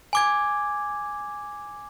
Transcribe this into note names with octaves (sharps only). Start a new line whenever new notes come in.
G#5 D6 G#6